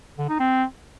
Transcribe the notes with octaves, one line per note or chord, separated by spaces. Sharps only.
D3
D#4
C4